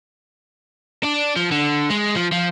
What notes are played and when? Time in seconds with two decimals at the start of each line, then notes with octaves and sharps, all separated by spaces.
1.03 D4
1.36 F3
1.52 D3
1.90 G#3
2.16 F3
2.32 F3